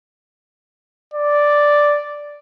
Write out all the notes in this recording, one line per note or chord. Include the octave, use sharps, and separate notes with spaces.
D5